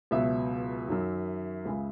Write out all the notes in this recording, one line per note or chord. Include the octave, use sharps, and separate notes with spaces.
C#2 B2 F#3 E5
F#2 D#3 F#3
C#2 C#3 G#3